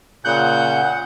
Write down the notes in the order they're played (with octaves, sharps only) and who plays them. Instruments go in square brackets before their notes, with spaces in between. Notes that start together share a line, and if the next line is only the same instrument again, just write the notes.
[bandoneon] A#2 C#3 G6 [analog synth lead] F#5